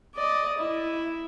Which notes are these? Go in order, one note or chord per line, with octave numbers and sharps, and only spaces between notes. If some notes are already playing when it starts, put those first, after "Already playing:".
D5 D#5
E4